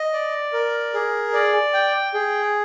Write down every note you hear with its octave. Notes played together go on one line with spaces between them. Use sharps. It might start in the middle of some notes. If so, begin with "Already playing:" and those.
Already playing: D#5
D5
A#4
G#4
D5
G5
G#4